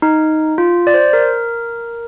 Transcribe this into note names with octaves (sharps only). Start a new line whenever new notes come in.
D#4
F4
D5
C5
A#4